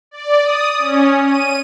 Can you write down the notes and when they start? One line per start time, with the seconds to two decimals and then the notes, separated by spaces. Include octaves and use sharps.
0.11 D5
0.41 D#6
0.79 C#4
1.24 D#7